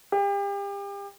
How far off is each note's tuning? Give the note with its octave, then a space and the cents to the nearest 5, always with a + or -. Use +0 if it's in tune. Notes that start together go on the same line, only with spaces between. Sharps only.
G4 +35